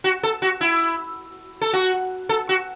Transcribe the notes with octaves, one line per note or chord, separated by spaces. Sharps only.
F#4
A4
F#4
E4
A4
F#4
A4
F#4